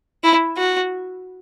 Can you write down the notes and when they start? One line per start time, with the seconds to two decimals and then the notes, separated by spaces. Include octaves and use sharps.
0.24 E4
0.57 F#4